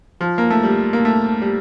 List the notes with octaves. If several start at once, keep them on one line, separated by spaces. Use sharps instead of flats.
F3
A#3
A3
G3
A#3
A3
G3